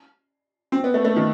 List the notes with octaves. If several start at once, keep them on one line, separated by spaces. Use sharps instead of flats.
C4
B3
A3
A3
D#3